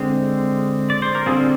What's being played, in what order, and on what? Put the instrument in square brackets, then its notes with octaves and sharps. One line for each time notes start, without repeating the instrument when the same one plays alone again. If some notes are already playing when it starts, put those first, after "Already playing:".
Already playing: [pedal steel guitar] D3 G#3 C4
D5
C5
A#4
D3 G3 C4 F4 G#4